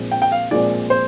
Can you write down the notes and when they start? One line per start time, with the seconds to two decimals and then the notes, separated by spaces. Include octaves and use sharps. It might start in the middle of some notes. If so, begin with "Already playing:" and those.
Already playing: A#1 A#2 G#3 C4
0.12 G5
0.22 G5
0.32 F5
0.51 A#1 A#2 G#3 C4 D5
0.90 C5